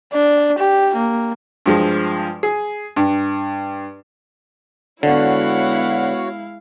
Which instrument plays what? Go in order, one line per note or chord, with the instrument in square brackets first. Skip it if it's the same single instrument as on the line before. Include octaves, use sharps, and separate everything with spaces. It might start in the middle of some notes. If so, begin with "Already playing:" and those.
[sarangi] D4
G4
A#3
[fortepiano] G2 F3 G#3
G#4
G2
[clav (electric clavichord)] D3 [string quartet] G#3 E4 F5 [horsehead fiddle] B3 F#5 [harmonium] F#4 C#5